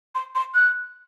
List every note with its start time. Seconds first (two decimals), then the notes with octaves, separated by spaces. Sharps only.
0.15 C6
0.35 C6
0.55 F#6